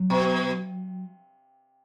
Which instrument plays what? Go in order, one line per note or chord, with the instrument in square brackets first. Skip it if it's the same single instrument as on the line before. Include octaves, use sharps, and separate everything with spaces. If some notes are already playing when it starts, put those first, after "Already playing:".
Already playing: [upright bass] F#3
[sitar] B2